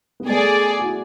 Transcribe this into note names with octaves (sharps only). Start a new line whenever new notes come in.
B3
A3 G#4 D5 G#5
F#4
E4